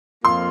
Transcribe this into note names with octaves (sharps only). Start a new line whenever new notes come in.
F2 F3 A#3 F4 C6